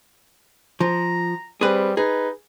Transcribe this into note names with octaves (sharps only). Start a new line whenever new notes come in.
F3 A#5
G3 C4 G#4 B4
D#4 G#4 B4